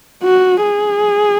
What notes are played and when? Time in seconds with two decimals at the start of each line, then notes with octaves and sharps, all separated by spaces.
0.23 F#4
0.63 G#4